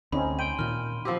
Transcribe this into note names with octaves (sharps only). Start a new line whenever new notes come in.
D2 C4 C#4 D#4 B5
G5 C6 D#7
A#2 D#3 F6
F3 C4 G4